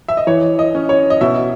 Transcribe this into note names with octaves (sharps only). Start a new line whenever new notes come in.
E5
D#5
E3 C#5
D#5
C#4
C#5
D#5
B2 E5